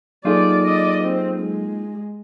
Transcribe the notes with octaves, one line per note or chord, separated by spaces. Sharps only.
F#3 A#3 D#4 F4 G#4 A4 D5
D5 D#5
C4
G#3